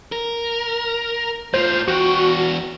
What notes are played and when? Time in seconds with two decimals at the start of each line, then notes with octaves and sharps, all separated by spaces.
0.12 A#4
1.54 A2 F4 C5
1.88 E2 F#4 G5